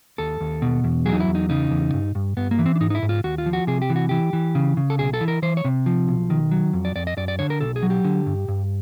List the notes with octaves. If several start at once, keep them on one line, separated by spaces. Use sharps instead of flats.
D#2 A4
D#2
B2
E2
F#3 G#4
D#4
E4
E2
D#4
C#3 D#4
E2
G2
G2
G2 B3
A#3
E3
C4
D4
G#2 D#4
D#4
E4
G#2
F4
D#2 F#4
F4
F3
F#4
C3 G#4
G4
E3
F#4
E3 G4
E3
C#3
C#3
A4
B1 G#4
A4
E3
A#4
E3 C5
C#5
C3
F3
B1
D#3
F#3
F2
D5
F2 D5
D#5
F#2 D5
D5
D3 C#5
A#4
B1 A4
G#4
F#3
G4
D3
G2
G2